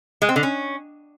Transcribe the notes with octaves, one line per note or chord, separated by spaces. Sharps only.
G#3
C4
D3
C#4